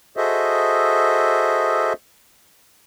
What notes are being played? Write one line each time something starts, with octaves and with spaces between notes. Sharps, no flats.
F#4 G#4 A4 C5 D#5 E5